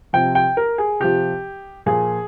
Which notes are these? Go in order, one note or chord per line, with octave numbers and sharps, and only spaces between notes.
C3 F3 G5
G5
A#4
G#4
C3 F3 G4
A#2 F3 G#4